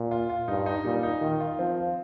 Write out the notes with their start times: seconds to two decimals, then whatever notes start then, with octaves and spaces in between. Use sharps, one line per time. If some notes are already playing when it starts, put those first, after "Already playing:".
Already playing: A#2
0.11 F4
0.30 F4
0.48 G2 D#4
0.66 D#4
0.85 A#2 G3
1.03 D#4
1.21 D#3 F4
1.40 F4
1.59 F3 C4
1.78 F4